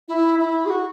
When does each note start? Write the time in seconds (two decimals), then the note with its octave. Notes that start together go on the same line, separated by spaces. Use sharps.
0.08 E4
0.39 E4
0.66 G#4
0.70 F#4